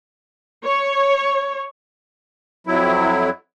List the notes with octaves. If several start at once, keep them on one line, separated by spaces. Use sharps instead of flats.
C#5
F2 F#3 E4